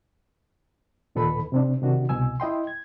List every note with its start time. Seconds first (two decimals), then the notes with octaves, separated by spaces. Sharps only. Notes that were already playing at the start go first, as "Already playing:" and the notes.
1.15 D#2 A#2 D#3 A4 B4 B5
1.52 C3 C4 D4
1.82 C3 D#3 D4 F#4
2.09 C2 B2 G#5 E6
2.40 E4 D#5 G5 C6
2.67 G#6